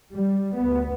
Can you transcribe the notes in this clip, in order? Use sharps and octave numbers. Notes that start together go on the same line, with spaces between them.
G3
D2 B3